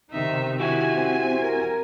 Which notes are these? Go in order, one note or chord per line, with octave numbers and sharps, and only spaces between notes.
C3 D#3 D#4 E5
E4 F#4 G4 G#5
C4
A#4